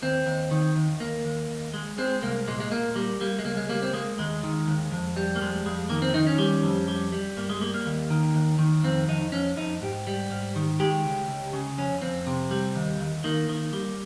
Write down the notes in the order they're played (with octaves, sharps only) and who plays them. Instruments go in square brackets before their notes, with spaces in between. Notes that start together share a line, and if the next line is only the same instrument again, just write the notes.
[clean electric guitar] D#2 C4
D#2
D#3
D#2
D#2 A#3
D#2
D#2
G#3
G#3 C4
C2 A#3
A#2 G#3
G#3
A#2 A#3
G3 A#3
G3 A#3
G#3
C#2 A#3
G#3
G3 A#3
C4
G#3 A#3
D#2 G#3
D#3
D#2
F2
G3
A#3
F2 G#3
F2 G#3
D#3 A#3
C4
D#3 D#4
C#4
G3
F2
G3
G3
G2 A#3
G#3
G3 A#3
A#3
D#2
D#3
D#2
D#3
F2 C4
F2 D#4
F2 C#4
F2 D#4
G#2 G4
G3
G#2
D#3
G#3 G4
C#2
C#2
C#3
F2 C#4
F2 C4
C3
G3
D#2
D#2
D#3 A#3
D#3
G3